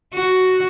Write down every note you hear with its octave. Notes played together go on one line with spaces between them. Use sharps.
F#4